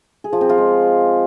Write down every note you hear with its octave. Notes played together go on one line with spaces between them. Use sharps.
G#4
F3
C4
F4
G#3